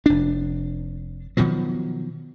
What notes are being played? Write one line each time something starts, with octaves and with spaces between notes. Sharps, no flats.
F1 D4
B2 D#3 F3 F#3